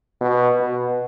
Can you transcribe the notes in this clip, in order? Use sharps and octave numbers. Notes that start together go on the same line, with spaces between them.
B2
B2